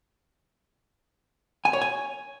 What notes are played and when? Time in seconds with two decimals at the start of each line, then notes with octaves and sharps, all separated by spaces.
1.65 G#5
1.73 C#5
1.82 G#5